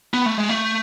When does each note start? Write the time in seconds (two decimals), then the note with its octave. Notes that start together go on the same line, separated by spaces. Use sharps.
0.14 B3
0.26 A3
0.38 G#3
0.49 A3